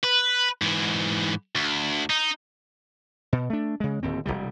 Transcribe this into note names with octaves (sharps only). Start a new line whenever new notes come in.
B4
G#2 E3
D2
D#4
B2
A3 D4
C#3 G#3
D1 D#2 C4
E1 C2 C3 G3